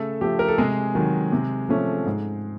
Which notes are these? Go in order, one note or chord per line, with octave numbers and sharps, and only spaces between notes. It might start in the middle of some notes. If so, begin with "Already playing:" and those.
Already playing: C#3 A3 A4
F3 A3 G4
A#4
A4
C3 G#3 G#4
D#3 F#3
C3
F3 A3 C#4
G#2